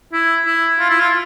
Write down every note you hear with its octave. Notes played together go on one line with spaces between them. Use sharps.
E4
E4
F4
E4
F4